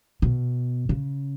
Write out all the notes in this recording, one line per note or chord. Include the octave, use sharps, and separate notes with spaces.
B2
C#3